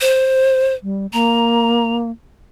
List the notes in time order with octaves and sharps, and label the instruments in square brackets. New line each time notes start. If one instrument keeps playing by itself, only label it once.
[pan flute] C5
[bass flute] G3
[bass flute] A#3 [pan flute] A#5